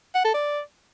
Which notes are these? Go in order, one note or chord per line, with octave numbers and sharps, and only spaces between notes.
F#5
A4
D5